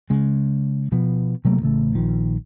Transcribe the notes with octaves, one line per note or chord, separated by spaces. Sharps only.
C#3 G#3
B2 F3 B3
C3 F#3 A3 A#3
A1 C#3 A3
A#1 D#3 F3